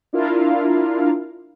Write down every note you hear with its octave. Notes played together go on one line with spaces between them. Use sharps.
D4 E4 F4 A#4 F5